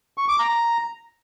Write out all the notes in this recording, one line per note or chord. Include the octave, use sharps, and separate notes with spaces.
C#6
D6
A#5